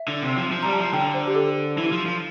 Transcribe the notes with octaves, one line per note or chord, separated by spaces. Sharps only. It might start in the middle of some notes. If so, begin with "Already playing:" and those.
Already playing: E5
D3
C3
F3
F3
G3 A#5
A5
F3
D3 G5
C5
G4
A4
E3
F3
F3